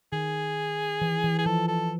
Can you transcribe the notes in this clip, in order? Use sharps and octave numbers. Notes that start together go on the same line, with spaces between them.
D#3 G#4
E3
E3
G#4
F3 A4
A4